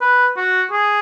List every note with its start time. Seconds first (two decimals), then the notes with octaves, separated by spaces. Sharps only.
0.01 B4
0.37 F#4
0.71 G#4